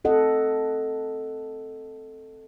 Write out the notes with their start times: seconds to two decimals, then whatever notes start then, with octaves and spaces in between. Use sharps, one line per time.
0.04 C4 A4 D#5 F#5